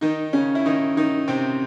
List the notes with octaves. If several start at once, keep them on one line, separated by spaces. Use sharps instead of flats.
D#3 D#4
C#3 C#4
E4
D#3 D#4
D#3 D#4
C3 C4